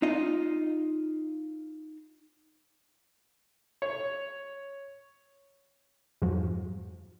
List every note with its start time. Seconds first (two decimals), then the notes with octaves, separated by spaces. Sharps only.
0.02 D#4 F4 D#5
3.82 C#5
6.22 F2 G#2 F3 F#3